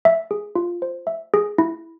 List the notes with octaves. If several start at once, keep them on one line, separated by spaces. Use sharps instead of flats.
E5
G#4
F4
C5
E5
G#4
E4